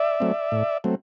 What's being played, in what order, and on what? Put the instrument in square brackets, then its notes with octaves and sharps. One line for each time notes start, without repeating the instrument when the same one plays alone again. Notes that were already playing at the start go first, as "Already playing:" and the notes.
Already playing: [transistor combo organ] D5 E5
F#3 A3 C4
A2
F#3 A3 C4